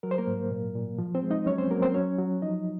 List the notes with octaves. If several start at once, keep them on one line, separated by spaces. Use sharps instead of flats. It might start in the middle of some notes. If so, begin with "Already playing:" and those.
F#3 A#4
C5
A#3 A#4
G#2
A#2
A#2
F3
C4 C5
G#3
D#4 D#5
F#3 C#4 C#5
C4 C5
F#3 A#3 A#4
C4 C5
F#3 C#4 C#5
F#3
F3 D#4 D#5